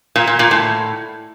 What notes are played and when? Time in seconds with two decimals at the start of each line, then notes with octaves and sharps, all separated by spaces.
0.16 A#2
0.27 A#2
0.39 A#2
0.51 A2